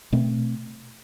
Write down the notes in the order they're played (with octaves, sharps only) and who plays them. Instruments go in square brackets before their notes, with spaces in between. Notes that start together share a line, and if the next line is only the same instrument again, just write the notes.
[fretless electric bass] B2 A3 C4